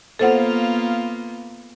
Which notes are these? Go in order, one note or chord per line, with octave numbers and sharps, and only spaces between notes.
A#3 B3 F4 A4 C5 F#5